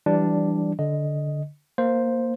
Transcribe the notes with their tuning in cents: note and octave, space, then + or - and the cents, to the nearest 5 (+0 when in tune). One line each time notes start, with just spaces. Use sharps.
E3 +15 G3 -10 D4 +0
D3 -5 D#5 +0
A#3 +0 C5 +0